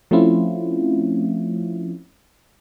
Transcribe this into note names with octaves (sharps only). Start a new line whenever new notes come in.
F3 A3 C4 C#4 E4 F4